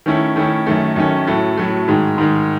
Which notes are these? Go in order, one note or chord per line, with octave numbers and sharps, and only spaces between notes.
D#3 A3 C#4 E4
D#3 A3 C#4 E4
F#2 D#3 A3 C#4
F#2 D#3 A3 C#4
A2 F#3 A3
A2 F#3 A3
G#2 D#3 G#3
G#2 D#3 G#3